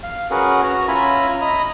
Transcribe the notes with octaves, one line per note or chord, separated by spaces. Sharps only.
F5
C#4 F#4 G#4 A#4 B4 F#5
F#4 A#5
C#4 F4 E5 G#5 A#5 B5
D#5 A#5 B5 D#6